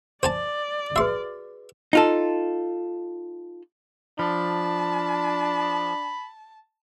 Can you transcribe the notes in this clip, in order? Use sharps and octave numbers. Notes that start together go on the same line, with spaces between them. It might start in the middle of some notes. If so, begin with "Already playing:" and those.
C5 D5 G#5 A5
F#4 G#4 B4 E5 C6
D#4 F4 A4
F3 D4 A5 B5